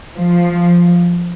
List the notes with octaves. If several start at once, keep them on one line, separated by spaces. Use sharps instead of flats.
F3